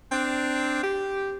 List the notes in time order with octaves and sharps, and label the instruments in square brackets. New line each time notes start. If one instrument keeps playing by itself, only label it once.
[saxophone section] C4 D4
G4